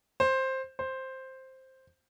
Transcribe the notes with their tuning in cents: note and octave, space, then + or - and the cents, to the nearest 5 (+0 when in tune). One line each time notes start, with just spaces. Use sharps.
C5 +10
C5 +5